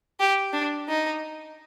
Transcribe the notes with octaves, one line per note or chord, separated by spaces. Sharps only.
G4
D4
D#4